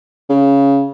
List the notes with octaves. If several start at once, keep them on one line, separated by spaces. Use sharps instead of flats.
C#3